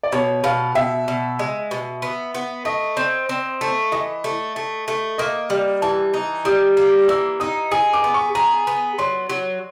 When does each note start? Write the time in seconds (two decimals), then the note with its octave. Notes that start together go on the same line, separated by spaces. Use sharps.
0.03 D5
0.12 B2 C#5
0.44 B2 F5
0.75 B2 E5
1.08 B2
1.39 G#3
1.71 B2
2.02 B3
2.35 B3
2.65 A3 D#5
2.97 C4
3.29 C4
3.61 A3
3.92 E3 D#5
4.24 A3
4.56 A3
4.88 A3
5.18 A#3 D#5
5.50 G3
5.82 E3 A5
6.14 D#4
6.45 G3 D#6
6.77 A#3
7.08 E3 E6
7.40 D#4 D#6
7.71 G#4 D#6
7.93 D6
8.04 B3
8.14 C#6
8.35 G#4 A#5
8.67 B3
8.98 F#3 C6
9.30 F#3